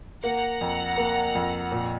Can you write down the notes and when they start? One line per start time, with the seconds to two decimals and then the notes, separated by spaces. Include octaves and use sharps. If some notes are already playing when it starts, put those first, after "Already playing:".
0.24 A#3 F#5 A#5
0.61 F2
0.98 A#3
1.35 F2
1.72 A#2